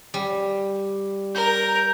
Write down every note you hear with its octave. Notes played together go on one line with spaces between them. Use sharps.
G3
A#4 G6